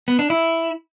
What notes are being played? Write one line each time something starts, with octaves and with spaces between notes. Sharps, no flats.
B3
D4
E4